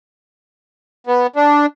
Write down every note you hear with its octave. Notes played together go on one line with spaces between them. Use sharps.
B3
D4